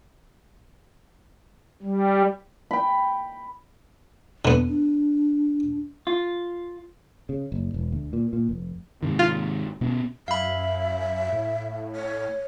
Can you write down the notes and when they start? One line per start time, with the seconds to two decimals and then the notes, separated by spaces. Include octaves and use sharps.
1.82 G3
2.71 G5 B5
4.45 D3 B3
4.68 D4
6.07 F4
7.29 C#3
7.52 F#1
7.74 E1
7.92 D2
8.13 A#2
8.33 A#2
8.49 F1
9.03 G#2 C3 D#3
9.19 F4
9.81 B2 B3 C#4
10.28 F#2 E5 F5 B5
11.32 A2
11.95 C#5